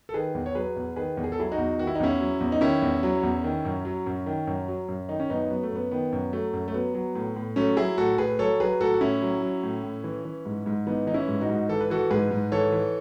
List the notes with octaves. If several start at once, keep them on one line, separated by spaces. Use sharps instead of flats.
A4
D#3 G#4 B4
E2
C#5
F#3 G#4 B4
E2
D#3 G#4 B4
E2
G#4
A4
F#3 E4 G#4
D#4 F#4
E2
D#3 F#4
E4
D#4
E2 C#4 E4
F#3
E2
D#4
D#3 C#4 E4
E2
F#3
E2
D#3
F#2
F#3
F#2
D#3
F#2
F#3
F#2
D#3 D#4
C#4
F#2 B3 D#4
F#3 B3
A3
F#2 B3
D#3 B3
F#2
F#3 A3
F#2
A3
F#3 B3
F#3
A2
A2
F#3 A3 C#4
F#3 E4 G#4
A2 F#4 A4
A2 G#4 B4
F#3 A4 C#5
F#3 G#4 B4
A2 F#4 A4
F#4
A2 C#4 E4
F#3
F#3
A2
A2
E3
E3
G#2
G#2
E3 B3 D#4
E3 D#4
C#4 E4
G#2
D#4 F#4
G#2
E3 A4
B4
E3 F#4 A4
G#2 G#4 B4
G#2
E3 A4 C#5
E3